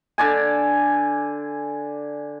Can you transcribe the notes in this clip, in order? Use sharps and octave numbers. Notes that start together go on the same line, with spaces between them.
D3 D5 G#5